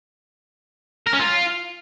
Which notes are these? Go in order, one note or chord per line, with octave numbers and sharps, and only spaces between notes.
A#4
C#4
F4